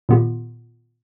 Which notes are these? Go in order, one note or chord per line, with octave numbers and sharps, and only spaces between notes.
A#2 D#3 B3 F4 G4